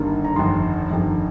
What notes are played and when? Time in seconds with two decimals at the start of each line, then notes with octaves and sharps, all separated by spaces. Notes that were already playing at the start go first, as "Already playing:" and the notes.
Already playing: G1 G2 D#3 A#3
0.25 A#5
0.35 G1 F2 D#3 C6
0.90 G1 F2 D#3